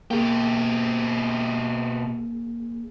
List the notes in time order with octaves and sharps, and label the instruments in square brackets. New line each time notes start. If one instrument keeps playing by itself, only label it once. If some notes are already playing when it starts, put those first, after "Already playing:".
[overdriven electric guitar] B2 G4 [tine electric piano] A#3 G#4